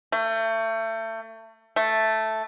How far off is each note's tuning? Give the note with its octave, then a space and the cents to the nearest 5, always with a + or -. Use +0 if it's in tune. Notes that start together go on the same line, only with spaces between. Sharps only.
A3 +30
A3 +0